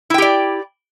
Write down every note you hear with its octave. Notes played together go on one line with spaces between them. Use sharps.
E4 G4 D5 G5